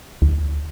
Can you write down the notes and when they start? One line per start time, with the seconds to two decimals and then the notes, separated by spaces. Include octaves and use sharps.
0.22 D2